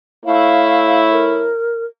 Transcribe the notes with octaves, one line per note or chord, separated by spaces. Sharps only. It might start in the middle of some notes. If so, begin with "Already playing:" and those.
A3 E4 C#5 F5
A#4